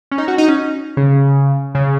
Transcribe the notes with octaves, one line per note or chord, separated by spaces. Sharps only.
C#4
D#4
F#4
D#4
C#4
C#3
C#3